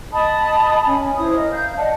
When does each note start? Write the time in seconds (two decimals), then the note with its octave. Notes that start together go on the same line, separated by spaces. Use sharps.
0.12 D#5 A5 B5 D#6
0.85 C#4 G#5 B5
1.17 E4 C5 C#5 D#6
1.35 A#4 D#5
1.52 F5 G6
1.77 D5 D#5 F#5 A5